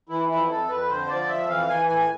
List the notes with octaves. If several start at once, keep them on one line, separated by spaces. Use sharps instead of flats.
E3 E4
F2 E4
F2 A4
F2 B4
D3 C5
F3 D5
F2 E5
E3 F5
E3 G#5
A2 G#5